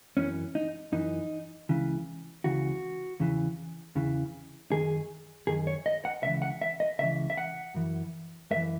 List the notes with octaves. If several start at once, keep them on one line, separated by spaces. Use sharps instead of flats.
F#2 E3 C#4
D#4
F#2 E3 D#4
C#2 C#3 E3
C#2 C#3 E3 F#4
E2 C#3 E3
E2 C#3 E3
F#2 D#3 G#4
F#2 D#3 G#4
C#5
D#5
F#5
C#2 C#3 E3 E5
F#5
E5
D#5
C#2 C#3 E3 E5
E5
F#5
F#2 E3
F#2 E5
E3